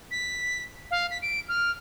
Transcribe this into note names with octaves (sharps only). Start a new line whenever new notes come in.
B6
F5
B6
D7
F6